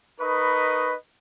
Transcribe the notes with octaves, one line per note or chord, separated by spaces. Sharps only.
D#4 A#4 B4 D#5 B5 C#6